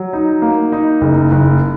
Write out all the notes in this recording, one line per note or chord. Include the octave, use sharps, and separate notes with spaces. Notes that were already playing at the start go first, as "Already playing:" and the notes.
Already playing: F#3
D#4
A#3
D#4
F#1
F#1